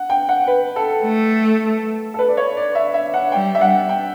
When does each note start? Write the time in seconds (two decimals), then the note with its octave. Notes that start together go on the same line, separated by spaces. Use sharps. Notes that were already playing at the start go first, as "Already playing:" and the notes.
Already playing: F#5
0.10 G5
0.29 F#5
0.48 B4
0.76 A4
1.04 A3
2.14 A4
2.19 B4
2.29 D5
2.37 C#5
2.57 D5
2.75 E5
2.94 E5
3.14 F#5
3.32 G3 G5
3.55 E5
3.61 F#5
3.89 G5